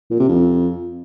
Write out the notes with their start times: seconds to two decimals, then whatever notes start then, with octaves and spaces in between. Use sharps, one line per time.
0.11 A#2
0.19 C3
0.28 F2